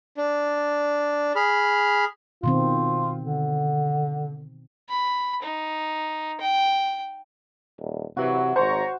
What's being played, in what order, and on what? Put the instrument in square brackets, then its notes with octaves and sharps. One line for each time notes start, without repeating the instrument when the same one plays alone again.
[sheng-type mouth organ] D4
G#4 B5 F6
[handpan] B2 D#3 C4 [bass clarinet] F4
[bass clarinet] D3
[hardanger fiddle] B5
D#4
G5
[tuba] D#1
[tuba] C3 [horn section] E3 F#3 [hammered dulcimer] F#4
[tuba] G#1 [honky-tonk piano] C5 [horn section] C#5 A#5